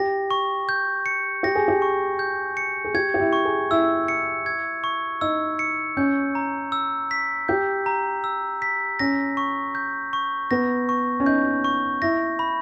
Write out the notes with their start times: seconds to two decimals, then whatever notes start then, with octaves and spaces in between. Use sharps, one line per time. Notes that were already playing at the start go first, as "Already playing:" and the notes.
Already playing: G4 A#6
0.31 C#6
0.69 G6
1.06 C#7
1.43 G4 A#6
1.55 G#4
1.68 G4
1.82 C#6
2.19 G6
2.57 C#7
2.85 G#4
2.94 G4 G#6
3.14 G4
3.20 E4
3.33 C#6
3.45 G#4
3.71 E4 E6
4.08 C#7
4.46 G#6
4.84 C#6
5.21 D#4 E6
5.59 C#7
5.97 C#4 G6
6.35 A#5
6.72 E6
7.11 B6
7.48 G4 G6
7.86 A#5
8.24 E6
8.62 B6
8.99 C#4 A#6
9.37 C#6
9.75 G6
10.13 C#6
10.51 B3 A#6
10.89 C#6
11.20 C#4
11.26 D#4 G6
11.64 C#6
12.02 E4 A#6
12.39 B5